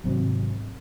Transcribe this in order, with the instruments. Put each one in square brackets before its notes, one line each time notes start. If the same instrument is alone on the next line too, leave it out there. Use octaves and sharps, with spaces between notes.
[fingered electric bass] G#1 C3 F#3 C4